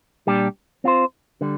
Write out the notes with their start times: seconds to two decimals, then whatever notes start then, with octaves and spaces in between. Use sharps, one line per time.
0.27 A#2 G3 D4 G4
0.84 C4 F4 C5
1.41 D3 G3